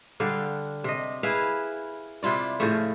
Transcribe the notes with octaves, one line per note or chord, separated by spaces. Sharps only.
D3 G3 D4 F5
C3 D#5
E4 G#4 B4 F5
C3 E4 F4 D5
A2 C#3 F3 A3